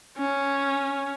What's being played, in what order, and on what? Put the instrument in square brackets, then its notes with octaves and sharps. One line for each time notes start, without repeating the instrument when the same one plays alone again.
[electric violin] C#4